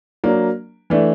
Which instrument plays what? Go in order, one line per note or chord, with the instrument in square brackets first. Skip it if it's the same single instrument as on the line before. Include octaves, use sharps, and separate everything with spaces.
[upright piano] F#3 A#3 D4
E3 A3 D4